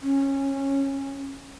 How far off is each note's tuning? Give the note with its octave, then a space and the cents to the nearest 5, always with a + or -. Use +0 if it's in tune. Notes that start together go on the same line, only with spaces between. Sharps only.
C#4 -20